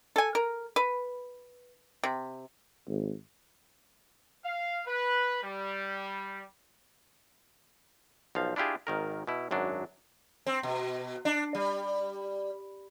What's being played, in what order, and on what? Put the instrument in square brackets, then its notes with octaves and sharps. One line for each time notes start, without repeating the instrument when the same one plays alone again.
[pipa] A4 G#5
A#4
B4
C3
[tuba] G#1
[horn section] F5
B4
G3
[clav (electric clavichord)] B1 F3 F5
D4 E4 F4 G4 G#4
G#1 D#3 A#4
B2 E4
G#1 F#2 F#3 D4
[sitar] C4
B2
D4
G3